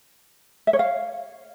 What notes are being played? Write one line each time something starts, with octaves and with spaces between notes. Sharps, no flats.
E5
C#5
F5